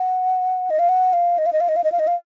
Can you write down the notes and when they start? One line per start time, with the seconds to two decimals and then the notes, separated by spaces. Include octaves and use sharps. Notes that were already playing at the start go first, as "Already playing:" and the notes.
Already playing: F#5
0.70 D#5
0.79 F5
0.89 F#5
1.13 F5
1.38 D#5
1.46 F5
1.53 D#5
1.61 F5
1.69 D#5
1.76 F5
1.84 D#5
1.92 F5
1.99 D#5
2.07 F5